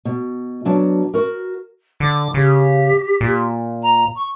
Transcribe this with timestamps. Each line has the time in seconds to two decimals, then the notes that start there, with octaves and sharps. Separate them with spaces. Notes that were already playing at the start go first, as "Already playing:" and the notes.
0.05 B2
0.65 B2 F#3 D4 A5
1.14 F#4 A#4
2.00 D3 D6
2.34 C#3 G4
3.21 A#2
3.83 A#5
4.15 C#6